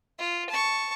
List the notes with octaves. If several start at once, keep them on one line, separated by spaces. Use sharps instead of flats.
F4
A5 C#6